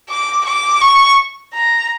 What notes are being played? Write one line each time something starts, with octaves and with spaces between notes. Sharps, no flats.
D6
D6
C#6
A#5